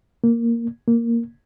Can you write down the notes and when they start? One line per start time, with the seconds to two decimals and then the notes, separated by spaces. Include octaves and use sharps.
0.24 A#3
0.88 A#3